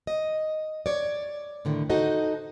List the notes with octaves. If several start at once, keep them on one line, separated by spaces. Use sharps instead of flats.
D#5
C#5 D5
A2 D3 D#3
D#4 F#4 A4 C5 D#5